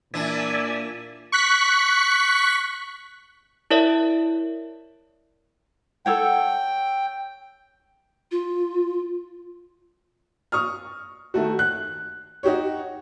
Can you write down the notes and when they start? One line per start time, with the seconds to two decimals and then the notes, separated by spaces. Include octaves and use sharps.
0.14 A#2 E3 D4 D5 E5 G#5
1.32 C#6 F#6 B6
3.71 E4 A#4 C#5 D5 E5
6.06 A4 C#5 F#5 G5
8.31 F4
10.52 C#6 D#6 F6
11.34 D#3 A3 F#4
11.59 F#6
12.43 D#4 F#4 G4 C#5